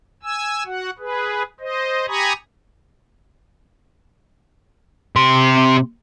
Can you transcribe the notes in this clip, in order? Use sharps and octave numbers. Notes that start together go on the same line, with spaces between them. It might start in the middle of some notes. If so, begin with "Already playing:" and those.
G#5 E6
F#4 F#5
G#4 B4
C5 D#5
G4 G#5 A#5 B5 C#6 D#6
C3 C6